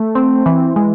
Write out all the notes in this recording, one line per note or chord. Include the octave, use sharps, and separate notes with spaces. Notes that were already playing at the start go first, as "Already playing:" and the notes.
Already playing: A3
C4
E3
G#3